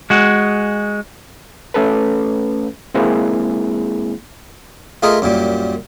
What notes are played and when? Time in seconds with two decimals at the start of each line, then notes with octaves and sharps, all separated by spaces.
0.10 G#3 F#4
1.74 A3 C#4 A4 B4
2.94 G#3 A#3 C4 E4 G#4
5.03 A3 F4 G#4 A#4 D#5
5.22 F#2 A#2 G3